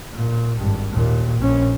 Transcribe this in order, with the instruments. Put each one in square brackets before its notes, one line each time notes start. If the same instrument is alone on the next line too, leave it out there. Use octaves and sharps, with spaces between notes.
[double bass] A#2
G#1 G2
D#2 A#2
A#1 C#4